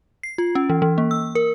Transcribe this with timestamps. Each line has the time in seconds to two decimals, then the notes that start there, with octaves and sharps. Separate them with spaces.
0.23 C7
0.38 F4
0.55 C#4
0.70 E3
0.82 E3
0.98 A#3
1.11 E6
1.35 A#4